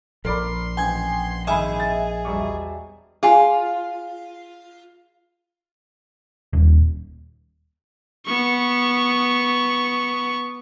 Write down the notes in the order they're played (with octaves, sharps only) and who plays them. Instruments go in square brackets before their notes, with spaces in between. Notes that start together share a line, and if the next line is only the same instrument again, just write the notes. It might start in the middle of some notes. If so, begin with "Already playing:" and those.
[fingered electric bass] A#1 [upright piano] A#4 D5 B5 [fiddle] C6
[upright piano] A1 [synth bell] G5 G#5 G#6
[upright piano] G#1 B5 [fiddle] G#4 [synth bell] D#5 E5 G#5
[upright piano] A6
E1 G3 C#6
[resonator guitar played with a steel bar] F4 [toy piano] G#4 F5 G#5
[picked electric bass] D#1
[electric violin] B3 C#6